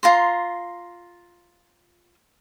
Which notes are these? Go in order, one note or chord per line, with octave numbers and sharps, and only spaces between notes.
F4 A#5 C6